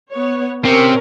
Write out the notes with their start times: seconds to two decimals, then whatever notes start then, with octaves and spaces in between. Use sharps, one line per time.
0.13 B3 C#5
0.65 C3 C#4 A#4